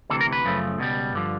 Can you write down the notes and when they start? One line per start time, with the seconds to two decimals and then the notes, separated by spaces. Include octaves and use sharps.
0.10 D2 C3 E3 A4
0.21 A#4
0.32 B4
0.44 F#2 C#3 F3 A3
0.78 C#2 B2 G3
1.13 G2 D3 F3